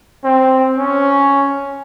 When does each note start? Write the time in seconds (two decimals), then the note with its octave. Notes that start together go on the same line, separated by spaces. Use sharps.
0.24 C4
0.77 C#4